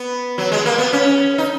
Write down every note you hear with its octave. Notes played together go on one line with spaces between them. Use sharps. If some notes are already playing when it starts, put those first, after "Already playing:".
Already playing: B3
F#3
G#3
A#3
B3
C#4
D#4